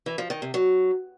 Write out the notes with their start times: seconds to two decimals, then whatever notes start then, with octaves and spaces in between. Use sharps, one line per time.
0.06 E3
0.18 F3
0.30 D#3
0.42 C3
0.54 F#3